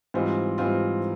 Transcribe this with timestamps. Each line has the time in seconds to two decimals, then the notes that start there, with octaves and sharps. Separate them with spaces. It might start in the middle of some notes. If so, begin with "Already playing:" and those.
0.14 G#2 E3 G3 C4 F4
0.58 G#2 E3 G3 C4 F4